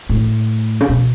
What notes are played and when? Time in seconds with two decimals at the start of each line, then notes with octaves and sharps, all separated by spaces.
0.09 A2
0.81 C#3
0.89 B2